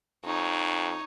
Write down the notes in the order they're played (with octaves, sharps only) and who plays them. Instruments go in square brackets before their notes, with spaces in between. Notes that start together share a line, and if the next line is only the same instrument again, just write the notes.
[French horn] F2 [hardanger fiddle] D#4 C#5